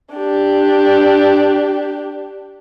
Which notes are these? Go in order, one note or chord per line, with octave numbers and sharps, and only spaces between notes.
D4 G4